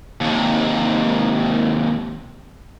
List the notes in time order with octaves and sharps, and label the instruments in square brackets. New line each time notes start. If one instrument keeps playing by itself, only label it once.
[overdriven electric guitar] D#2 C3